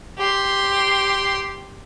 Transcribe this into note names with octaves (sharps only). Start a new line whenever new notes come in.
G4 C6